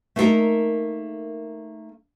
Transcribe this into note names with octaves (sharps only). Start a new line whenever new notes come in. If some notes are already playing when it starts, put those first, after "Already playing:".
A3 A#3 D#4 F#4 A4 A#4